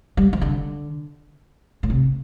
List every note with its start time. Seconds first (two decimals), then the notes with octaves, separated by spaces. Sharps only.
0.17 G3
0.33 F3
0.41 D3
1.83 A2
1.90 C3